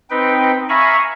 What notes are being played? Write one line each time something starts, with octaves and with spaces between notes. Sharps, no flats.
C4 D#4 B4 G5
E5 F5 G#5 A#5 B5 C#6